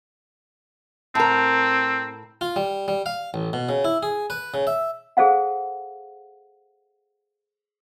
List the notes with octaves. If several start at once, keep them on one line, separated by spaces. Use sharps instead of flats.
A2 C4 A#4
F4
G3
G3
F5
A1
B2
C#3
E4
G#4
B4
C#3
E5
G#4 A4 C5 F5 F#5